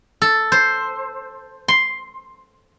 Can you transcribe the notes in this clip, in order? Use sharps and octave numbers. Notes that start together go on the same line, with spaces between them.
A4
C5
C6